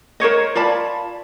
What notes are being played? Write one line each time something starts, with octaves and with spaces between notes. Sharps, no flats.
A#4 C5 C#5 D#5
F4 D5 A5 B5